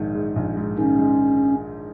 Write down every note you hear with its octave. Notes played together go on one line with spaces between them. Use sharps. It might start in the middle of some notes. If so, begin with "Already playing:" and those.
Already playing: A#1 G#2 D#3
G#3
A#1
G#2
D#3 C#4
G#3